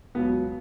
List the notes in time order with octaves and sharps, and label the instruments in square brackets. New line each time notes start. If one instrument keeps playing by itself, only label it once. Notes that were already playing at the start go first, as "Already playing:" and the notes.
[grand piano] C#2 B2 F#3 B3